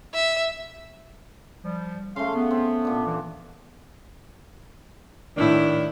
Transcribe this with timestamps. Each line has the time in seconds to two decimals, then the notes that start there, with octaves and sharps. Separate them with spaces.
0.14 E5
1.64 F3 G3
2.16 C#3 A3 F5 C6
2.34 B3
2.51 C4
2.85 A#2 D4
3.06 E3
5.37 A2 D#3 D4 E4